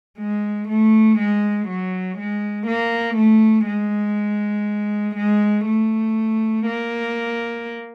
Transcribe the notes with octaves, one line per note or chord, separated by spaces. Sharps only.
G#3
A3
G#3
F#3
G#3
A#3
A3
G#3
G#3
A3
A#3